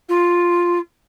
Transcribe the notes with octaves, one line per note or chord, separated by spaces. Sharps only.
F4